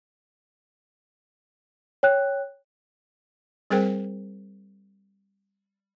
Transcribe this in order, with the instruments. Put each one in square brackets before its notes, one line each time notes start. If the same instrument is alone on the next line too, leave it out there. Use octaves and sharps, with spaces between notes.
[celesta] C#5 G5 F#6
[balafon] G3 C4 G#4 A#4 C5 G5